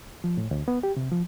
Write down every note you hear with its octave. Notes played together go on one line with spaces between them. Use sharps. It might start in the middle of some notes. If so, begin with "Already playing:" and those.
F3
A2
D2
B3
G4
C3
F3